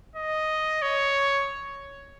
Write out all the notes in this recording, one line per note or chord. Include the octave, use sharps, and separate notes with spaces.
D#5
C#5